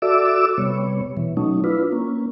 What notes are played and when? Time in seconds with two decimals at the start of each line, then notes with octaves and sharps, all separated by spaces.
0.02 F#4 A4 D5 E5 D6 E6
0.58 C3 G3 B3 C#5
1.17 B2 E3
1.37 F#3 A3 C#4 D#4
1.64 D4 E4 F4 B4
1.92 A#3 C#4